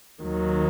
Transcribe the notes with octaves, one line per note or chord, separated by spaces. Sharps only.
D#2 D#3 F#3